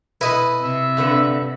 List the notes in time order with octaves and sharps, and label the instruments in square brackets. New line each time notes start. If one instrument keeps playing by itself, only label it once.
[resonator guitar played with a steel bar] B2 B4 [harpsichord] E4 D#5
[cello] C3 [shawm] E5
[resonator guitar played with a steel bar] G2 D3 B4